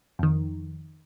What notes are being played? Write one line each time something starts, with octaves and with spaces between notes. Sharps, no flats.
F2 D#3